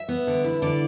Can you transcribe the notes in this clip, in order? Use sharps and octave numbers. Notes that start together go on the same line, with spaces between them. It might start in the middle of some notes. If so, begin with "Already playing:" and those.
Already playing: E5
B3
D3
E4
D3 D5